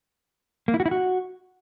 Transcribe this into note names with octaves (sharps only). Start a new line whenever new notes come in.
A#3
E4
F#4
E4
F#4